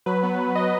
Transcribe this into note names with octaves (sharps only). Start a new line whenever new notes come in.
F#3 B4
B3
F#3
B3 D#5